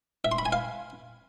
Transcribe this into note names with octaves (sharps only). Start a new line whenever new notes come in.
E5
C6
B5
G#5
F5